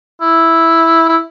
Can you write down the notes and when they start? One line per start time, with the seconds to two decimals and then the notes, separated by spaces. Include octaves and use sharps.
0.22 E4
1.09 E4